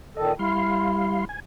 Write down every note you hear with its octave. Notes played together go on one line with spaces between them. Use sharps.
A#2 D#3 A4 D#5
G3 E4 F5 C6
G#5